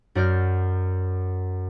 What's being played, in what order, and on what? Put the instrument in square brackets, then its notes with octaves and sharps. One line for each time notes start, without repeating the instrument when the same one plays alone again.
[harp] F#2 F#4 D5 F6 G6